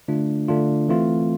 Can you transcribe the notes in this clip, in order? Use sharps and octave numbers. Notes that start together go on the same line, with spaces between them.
D3 A3 D4 F4
D3 A3 D4 F4
E3 A3 C4 F4